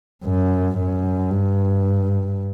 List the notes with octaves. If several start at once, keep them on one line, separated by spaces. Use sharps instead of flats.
F#2
F#2
G2